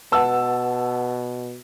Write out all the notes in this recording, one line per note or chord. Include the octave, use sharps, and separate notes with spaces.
B2 B4 F#5 A5 E6